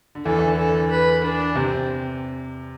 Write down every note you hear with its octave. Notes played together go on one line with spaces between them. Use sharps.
D3
E2 E3 A4
E3
D3
A4
D3
B4
D4
C3 C4